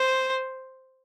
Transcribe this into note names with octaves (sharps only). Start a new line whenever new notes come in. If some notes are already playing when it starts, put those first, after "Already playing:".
Already playing: C5